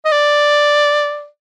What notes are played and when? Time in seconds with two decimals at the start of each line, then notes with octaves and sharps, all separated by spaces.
0.05 D#5
0.12 D5